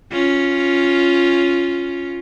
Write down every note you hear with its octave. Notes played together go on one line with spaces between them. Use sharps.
C#4 F4